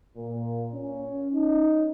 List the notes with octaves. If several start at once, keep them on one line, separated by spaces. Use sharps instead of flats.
A#2
C#4
D#4